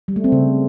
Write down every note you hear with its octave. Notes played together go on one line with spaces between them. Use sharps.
G3
A3
C4
C#3